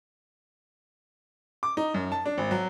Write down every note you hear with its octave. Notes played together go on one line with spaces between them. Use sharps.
D6
D#4
F#2
A5
D4
G#1
F#3